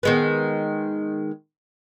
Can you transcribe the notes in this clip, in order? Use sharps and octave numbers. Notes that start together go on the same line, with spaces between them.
D#3 G#3 B3